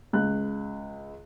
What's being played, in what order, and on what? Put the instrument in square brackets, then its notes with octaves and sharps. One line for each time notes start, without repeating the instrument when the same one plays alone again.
[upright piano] C#2 F#6